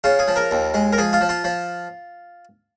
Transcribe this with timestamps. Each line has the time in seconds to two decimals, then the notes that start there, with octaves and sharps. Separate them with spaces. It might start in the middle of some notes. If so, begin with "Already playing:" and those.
0.04 C#3 F4
0.19 G#4
0.28 F3
0.36 A#4
0.51 D#2
0.74 G#3
0.93 A#4
0.98 F3 G#4
1.13 F4
1.21 F3
1.29 F4
1.44 F3